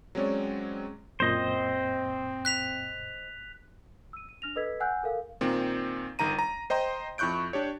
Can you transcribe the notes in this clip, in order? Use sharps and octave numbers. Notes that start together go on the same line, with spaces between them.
F#3 G#3 C4 C#4 C#5 D5
F#2 A#2 C4 C5 D#5
F#6 B6 F7
E6 D#7
D#7
D4 F6 A#6 F7
A4 B4 D#5 E6 G#6 B6
F#5 G#5 E6 F#6 G6
A4 A#4 F5
A#2 D#3 C4
G1 D#3 A#5 D#7
A#5
C5 D#5 G5 A#5 C6
F2 E4 C#6 F#6 G6 D7
D4 G4 C#5